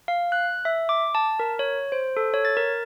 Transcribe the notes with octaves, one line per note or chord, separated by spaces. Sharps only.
F5
F#6
E5
D6
A5
A#4
C#5
C5
A4
C#5
A6
A#4